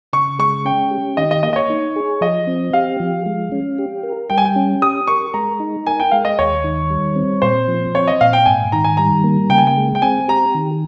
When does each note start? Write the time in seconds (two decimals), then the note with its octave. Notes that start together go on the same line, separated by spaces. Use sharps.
0.13 C#3 C#6
0.39 G#3 C#6
0.65 C#4 G5
0.91 G4
1.17 D#3 D#5
1.31 D#5
1.43 A#3 D#5
1.53 D#5
1.56 C#5
1.70 D#4
1.96 G#4
2.21 F3 D#5
2.47 C4
2.73 G4 F5
3.00 F3
3.26 G#3
3.52 C#4
3.78 G4
4.03 A#4
4.30 G3 G5
4.38 G#5
4.45 G5
4.56 C#4
4.82 G4 D#6
5.07 A#4 C#6
5.34 G#3 A#5
5.60 D#4
5.86 A#4 G#5
6.00 G5
6.11 G#3 F5
6.25 D#5
6.39 D#2 C#5
6.64 D#3
6.90 G3
7.16 C4
7.42 A#2 C5
7.68 F3
7.94 C4 C#5
8.08 D#5
8.21 A#2 F5
8.33 G5
8.46 G#2 G#5
8.72 D#3 A#5
8.84 G#5
8.97 G3 A#5
9.24 A#3
9.50 C#3 G5
9.58 G#5
9.67 G5
9.77 G#3
9.95 G5
10.02 C4 G#5
10.28 G4 A#5
10.55 D#3